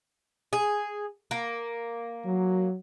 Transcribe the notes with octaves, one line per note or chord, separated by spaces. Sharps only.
G#4
A#3
F#3